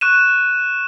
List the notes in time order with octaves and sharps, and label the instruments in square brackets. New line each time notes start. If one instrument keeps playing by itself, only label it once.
[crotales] C#6 F#6 D#7 E7